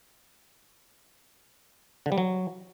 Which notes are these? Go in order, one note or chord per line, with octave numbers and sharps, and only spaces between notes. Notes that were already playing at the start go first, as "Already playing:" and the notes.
D3
G3
F#3